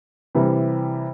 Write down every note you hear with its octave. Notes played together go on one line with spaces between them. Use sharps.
C3 E3 G3